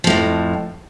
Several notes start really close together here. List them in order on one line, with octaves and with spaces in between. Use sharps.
F3 A2 F2